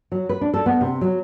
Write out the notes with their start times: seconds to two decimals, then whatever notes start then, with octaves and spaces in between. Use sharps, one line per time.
0.12 F#3
0.29 B4
0.41 D4
0.54 A4
0.66 B3
0.81 C3
1.01 F#3